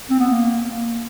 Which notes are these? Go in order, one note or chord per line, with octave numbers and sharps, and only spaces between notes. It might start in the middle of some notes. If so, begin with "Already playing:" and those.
C4
B3
A#3